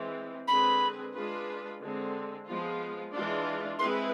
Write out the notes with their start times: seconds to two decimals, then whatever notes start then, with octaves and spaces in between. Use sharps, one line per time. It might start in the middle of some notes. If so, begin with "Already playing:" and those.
Already playing: E3 G#3 C4
0.47 D3 G#3 C4 G#4 B4 B5
1.13 G#3 D4 F4 G#4 B4
1.79 D3 G#3 C4
2.46 F3 G#3 B3 F4
3.12 E3 G#3 D4 F4
3.78 G#3 C4 E4 G#4 B4 C6